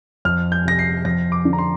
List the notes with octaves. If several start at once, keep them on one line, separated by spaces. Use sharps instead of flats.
F2 F6
G6
C3 A#6
C7
F2 A#6
D6
D3
A#5
C6